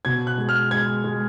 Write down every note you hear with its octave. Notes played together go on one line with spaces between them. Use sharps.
B2 G#6
F#6
G#3
F6
G#3 G#6
G#3